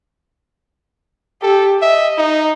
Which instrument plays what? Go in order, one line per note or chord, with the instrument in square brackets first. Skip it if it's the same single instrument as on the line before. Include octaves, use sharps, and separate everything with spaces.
[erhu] G4 [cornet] A4
[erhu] D#5 [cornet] E5
[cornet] D#4